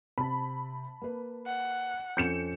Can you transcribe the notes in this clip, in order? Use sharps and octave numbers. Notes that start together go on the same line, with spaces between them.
C3 A5 B5
A#3 B4
F#5
F2 C#4 A4 G6 C#7 E7